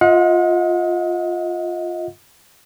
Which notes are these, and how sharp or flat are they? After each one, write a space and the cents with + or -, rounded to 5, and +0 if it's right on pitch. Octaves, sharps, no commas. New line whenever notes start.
F4 +5 D#5 +30 F#5 -40